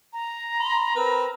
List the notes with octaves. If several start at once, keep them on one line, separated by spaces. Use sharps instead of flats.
A#5
B5 C6
C4 A#4 B4